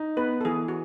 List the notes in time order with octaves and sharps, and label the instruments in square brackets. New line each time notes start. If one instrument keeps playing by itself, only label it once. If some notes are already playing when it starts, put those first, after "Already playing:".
Already playing: [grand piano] D#4
[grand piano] B3 [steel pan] B4
[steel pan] A4
[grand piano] E3 [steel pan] G#4
[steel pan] F#4